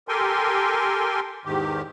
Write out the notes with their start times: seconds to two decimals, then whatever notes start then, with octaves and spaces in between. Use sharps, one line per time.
0.08 G4 A4 A#4 G5 G#5 C6
1.45 E2 G#2 D#3 G4